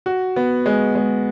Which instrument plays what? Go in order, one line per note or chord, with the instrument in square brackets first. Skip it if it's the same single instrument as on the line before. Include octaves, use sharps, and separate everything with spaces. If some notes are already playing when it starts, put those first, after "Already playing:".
[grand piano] F#4
B3
G#3
G#3